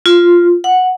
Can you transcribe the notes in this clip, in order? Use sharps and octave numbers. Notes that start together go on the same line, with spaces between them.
F4
F#5